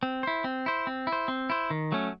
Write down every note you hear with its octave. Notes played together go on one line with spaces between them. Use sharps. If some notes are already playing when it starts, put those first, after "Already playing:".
C4
E4 C5
C4
E4 C5
C4
E4
C5
C4
E4 C5
D#3
F#3 A3 C#4